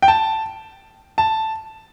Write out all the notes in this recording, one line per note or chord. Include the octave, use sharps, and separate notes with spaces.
G5
A5
A5